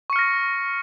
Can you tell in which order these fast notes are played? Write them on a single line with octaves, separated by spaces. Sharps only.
C#6 C#7 F6 A#6